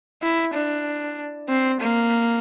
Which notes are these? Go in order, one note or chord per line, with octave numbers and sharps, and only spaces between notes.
E4
D4
C4
A#3